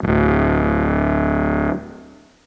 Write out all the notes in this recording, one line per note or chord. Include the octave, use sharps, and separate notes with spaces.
D1 G1